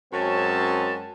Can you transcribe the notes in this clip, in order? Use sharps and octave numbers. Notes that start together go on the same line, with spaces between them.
F#2 G#3 C4 C#4 A5